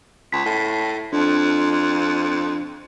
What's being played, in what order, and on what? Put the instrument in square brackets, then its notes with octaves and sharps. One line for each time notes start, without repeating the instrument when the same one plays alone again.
[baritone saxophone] C#2 [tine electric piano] B6
[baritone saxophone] A2
[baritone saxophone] F2 [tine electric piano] D4